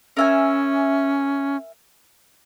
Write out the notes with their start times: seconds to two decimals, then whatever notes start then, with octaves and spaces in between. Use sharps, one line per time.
0.17 C#4 A#4 E5 G#5